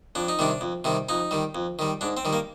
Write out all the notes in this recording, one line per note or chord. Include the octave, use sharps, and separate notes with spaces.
F2 D4
D#4
C3 D#3 G3 D4
F2
C3 D#3 G3
F2 D#4
D#3 G3
F2
D#3 G3
G#2 D4
C4
D#3 G3
A#3